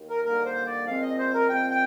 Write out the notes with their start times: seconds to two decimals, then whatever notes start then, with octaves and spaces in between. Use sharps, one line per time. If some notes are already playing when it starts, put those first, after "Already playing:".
Already playing: D#2
0.10 A#4
0.24 D#2 D3 G3 A#3 A#4
0.45 C5
0.66 D5
0.87 A#2 F3 G#3 C4 F5
1.02 D#5
1.18 C5
1.34 A#4
1.49 A#2 F3 G#3 C4 G5
1.70 G5